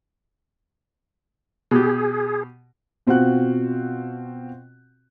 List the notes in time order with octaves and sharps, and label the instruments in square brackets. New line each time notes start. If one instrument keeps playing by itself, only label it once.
[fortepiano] B2 G4 [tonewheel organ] G#4
[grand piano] B2 C4 F4 F#4 F#5 F#6